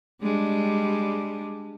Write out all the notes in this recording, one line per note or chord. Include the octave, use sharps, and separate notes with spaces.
G3 G#3 D4